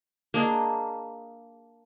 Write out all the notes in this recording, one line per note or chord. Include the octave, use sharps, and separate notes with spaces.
A#3 D4 G#4 D#5